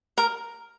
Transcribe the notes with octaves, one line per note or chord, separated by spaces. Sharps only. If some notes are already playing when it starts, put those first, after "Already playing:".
A#4